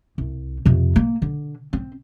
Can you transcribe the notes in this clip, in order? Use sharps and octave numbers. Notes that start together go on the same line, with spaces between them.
C2
F2 C3
A#3
D3
C4